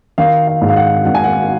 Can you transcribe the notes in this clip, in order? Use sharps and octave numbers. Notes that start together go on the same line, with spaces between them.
D#3 F5
F5
G#2
F5
F#5
G#1 F#5
G#5
F#5